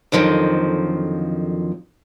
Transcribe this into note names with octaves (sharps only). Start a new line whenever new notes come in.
F2 D3 D#3 F3 F#3